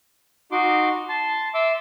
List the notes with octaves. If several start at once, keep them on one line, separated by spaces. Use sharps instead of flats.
D#4 F#4 C6 D6
A5 C6
E5 C6 D6 E6